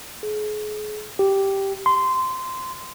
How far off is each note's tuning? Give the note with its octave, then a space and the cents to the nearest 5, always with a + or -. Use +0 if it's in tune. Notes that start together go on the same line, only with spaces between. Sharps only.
G#4 +35
G4 -5
C6 -15